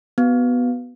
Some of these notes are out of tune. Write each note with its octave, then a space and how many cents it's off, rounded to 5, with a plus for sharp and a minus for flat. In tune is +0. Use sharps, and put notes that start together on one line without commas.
B3 +0 F#4 +25